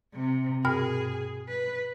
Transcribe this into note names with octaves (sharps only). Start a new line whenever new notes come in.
C3
G2 B2 G#4 F6
B4